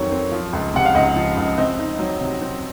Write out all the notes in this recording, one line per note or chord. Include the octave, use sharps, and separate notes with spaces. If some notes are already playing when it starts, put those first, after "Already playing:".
Already playing: F2 D#3 F#3 C4 C#5
C4
F3
C#2
C3 F#5
F5
C#2 D#5
F3
C#2
C4 D#5
D#4
F#3
C3
C4